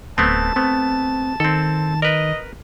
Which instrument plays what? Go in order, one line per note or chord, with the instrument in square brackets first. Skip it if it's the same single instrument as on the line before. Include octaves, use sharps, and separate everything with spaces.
[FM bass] D1 [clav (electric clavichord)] A3 B3 C4 [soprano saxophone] A5
[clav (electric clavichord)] A3 B3 [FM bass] C4
[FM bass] D#3 [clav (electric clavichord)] C4 A4
[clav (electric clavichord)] A#4 B4 [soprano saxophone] D#5